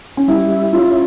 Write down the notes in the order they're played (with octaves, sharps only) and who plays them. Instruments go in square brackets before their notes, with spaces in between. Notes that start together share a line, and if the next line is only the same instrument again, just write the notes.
[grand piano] C#4
[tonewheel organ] G3 [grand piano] E4
[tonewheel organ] E4
[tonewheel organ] C#4 [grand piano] F4